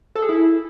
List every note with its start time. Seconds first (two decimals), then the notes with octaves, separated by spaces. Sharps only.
0.15 A4
0.22 G#4
0.29 E4